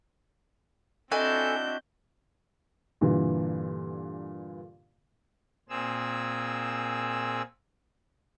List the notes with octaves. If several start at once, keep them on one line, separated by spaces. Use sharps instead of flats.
C4 D4 E4 F#4 A4 D#5 G#5 G6
G2 A#2 D3 E3
A#2 C4 G#4 E6